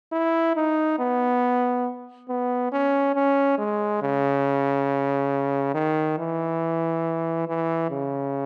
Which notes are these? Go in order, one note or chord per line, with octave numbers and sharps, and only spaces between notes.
E4
D#4
B3
B3
C#4
C#4
G#3
C#3
D#3
E3
E3
C#3